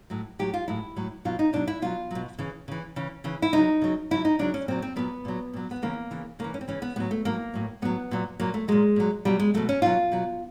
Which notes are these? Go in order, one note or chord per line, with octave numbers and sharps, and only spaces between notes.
A2 F#3
A2 F#3 G4
F4
A2 F#3 E4
A2 F#3
B2 F#3 F4
D#4
B2 F#3 D4
E4
B2 F#3 F4
B2 F#3
C#3 E3
C#3 E3
C#3 E3
C#3 E3
E4
C#3 F#3 D#4
C#3 F#3
C#3 F#3 E4
D#4
C#3 F#3 D4
C#4
A#2 F#3 C4
C4
A#2 F#3 B3
A#2 F#3
A#2 F#3
B3
C#3 E3 A#3
C#3 E3
C#3 E3 A#3
C#4
C4
C#3 E3 C#4
B3
A2 F#3 B3
A3
A2 F#3 A#3
A2 F#3
A2 F#3 B3
A#2 F#3
A#2 F#3 A#3
A3
A#2 F#3 G#3
A#2 F#3
B2 F#3 G3
G#3
B2 F#3 A3
C#4
B2 F#3 F4
B2 F#3